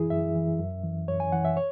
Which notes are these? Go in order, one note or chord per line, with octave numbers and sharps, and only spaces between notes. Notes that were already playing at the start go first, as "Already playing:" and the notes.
Already playing: F#2 E3 E4 G#4
F#2 E5
E3
F#2
E3
F#2 C#5
G#5
E3 F#5
E5
C#5